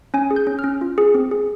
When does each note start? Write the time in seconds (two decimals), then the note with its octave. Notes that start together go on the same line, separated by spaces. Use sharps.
0.14 C#4 G#5
0.31 G#4
0.36 G6
0.47 C#4
0.59 F6
0.64 C#4
0.81 F4
0.98 G#4
1.15 C4
1.31 G#4